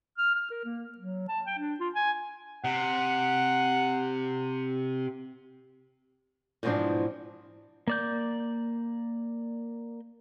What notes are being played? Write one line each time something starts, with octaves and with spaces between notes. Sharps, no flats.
F6
F6
A#4
A#3
F#3
A5
G5
D4
F4
G#5
C3 F#5
G#2 B2 E3 F3 C4 D4
A#3 D5 G6